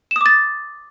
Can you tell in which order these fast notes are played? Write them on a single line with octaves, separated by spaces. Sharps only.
E7 D#6 D6 A6